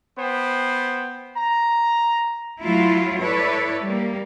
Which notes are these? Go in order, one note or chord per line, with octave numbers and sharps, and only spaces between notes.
B3 C5 G5
A#5
F#3 A3 E4 F4
E4 A4 B4 C#5 D5
G3 A#3